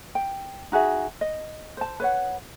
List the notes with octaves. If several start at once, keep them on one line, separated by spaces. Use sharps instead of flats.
G5
D#4 F#4 G#4 E5
D#5
C5 A5
B4 C#5 F#5